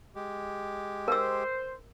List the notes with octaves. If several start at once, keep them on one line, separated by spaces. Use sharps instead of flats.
G#3 G4
A#4 C5 E6